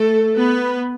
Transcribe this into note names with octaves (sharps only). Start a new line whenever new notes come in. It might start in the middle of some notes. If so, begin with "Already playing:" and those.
Already playing: A3 A4
B3 B4